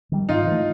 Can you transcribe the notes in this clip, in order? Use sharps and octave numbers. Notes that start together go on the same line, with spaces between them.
D#3 G3
G#2 D#4 F4
E3 A3